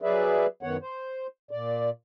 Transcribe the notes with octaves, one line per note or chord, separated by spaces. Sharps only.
F#3 G#4 B4 D5 E5
F#2 D#3 B3 C#5 F#5
C5
A#2 D5